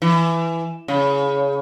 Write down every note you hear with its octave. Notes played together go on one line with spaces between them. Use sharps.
E3
C#3